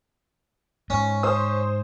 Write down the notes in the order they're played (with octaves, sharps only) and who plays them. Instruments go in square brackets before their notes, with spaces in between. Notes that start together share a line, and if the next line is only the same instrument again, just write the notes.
[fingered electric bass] G#2 [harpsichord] C#4
[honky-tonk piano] C5 D#6